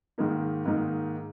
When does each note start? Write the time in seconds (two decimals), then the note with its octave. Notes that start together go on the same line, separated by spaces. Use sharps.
0.18 G#2 D#3 A#3 D#4
0.66 G#2 D#3 A#3 D#4